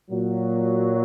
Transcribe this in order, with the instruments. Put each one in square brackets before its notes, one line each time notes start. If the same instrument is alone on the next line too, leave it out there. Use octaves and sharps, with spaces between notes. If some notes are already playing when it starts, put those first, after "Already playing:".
[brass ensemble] A#2 F#3